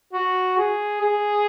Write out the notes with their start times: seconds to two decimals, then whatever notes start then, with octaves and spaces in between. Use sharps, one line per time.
0.13 F#4
0.58 G#4
1.01 G#4